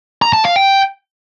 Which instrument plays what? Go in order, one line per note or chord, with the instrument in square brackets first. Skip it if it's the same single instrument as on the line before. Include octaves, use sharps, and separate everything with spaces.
[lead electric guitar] A#5
A5
F5
G5